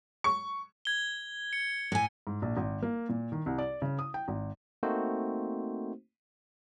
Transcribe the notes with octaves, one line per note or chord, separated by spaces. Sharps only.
C#6
G#6 G7
C#7
A2 G#5
G#2
A#1
G#1
A#3
A#2
D#3
C2
D5
C#3
D#6
G5
G#1
A3 A#3 C4 D#4 F#4 C5